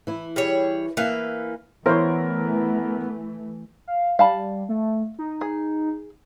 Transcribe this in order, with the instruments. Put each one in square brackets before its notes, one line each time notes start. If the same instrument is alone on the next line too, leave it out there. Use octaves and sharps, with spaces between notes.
[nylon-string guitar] E3 E4
[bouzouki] G3 G#4 C#5
[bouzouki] E3 B4 F5 [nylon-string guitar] A#3 E5
[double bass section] E3 A3 [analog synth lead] B3 [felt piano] E4 A#4 [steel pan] C5 C#5
[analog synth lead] F5
[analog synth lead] G3 [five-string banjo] F5 A5 B5
[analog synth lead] A3
D#4
[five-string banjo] G#4